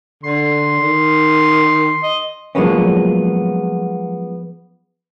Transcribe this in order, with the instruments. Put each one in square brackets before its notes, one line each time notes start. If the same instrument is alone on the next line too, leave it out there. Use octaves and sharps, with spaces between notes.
[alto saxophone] D3 [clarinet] C6
[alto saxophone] D#3
D#5
[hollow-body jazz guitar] F3 F#3 G#3 A#3 B3 C#4